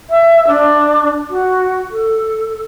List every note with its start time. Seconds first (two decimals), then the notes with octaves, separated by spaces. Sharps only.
0.10 E5
0.47 D4
1.30 F#4
1.90 A4